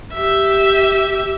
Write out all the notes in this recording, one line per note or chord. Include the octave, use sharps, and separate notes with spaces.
G4 E5